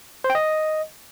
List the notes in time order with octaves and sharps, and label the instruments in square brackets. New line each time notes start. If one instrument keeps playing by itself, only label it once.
[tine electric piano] C5
G5
D#5